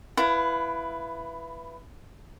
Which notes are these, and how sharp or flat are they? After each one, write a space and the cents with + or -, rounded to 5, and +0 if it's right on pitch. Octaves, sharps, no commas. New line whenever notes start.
E4 +20 B4 +0 F5 +25